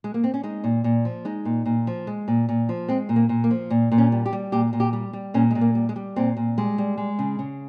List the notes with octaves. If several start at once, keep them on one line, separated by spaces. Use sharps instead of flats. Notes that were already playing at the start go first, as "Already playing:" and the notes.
G#3
A#3
C4
C#4
G#3 D#4
A#2
A#2
F3
G#3 D#4
A#2
A#2
F3
G#3
A#2
A#2
F3
G#3 C4
A#2
A#3
A#2
A#3
F3
A#2
A#2
C#4
G3
G4
G3
A#2 G4
A#2
G4
G3
G3
A#2 C#4
A#2 G#3
A#3
G3
G#3
G3
A#2 C4
A#2
G3 G#3
G3
G#3
C#3
C#3